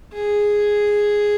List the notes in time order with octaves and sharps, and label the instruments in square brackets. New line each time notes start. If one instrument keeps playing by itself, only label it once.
[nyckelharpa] G#4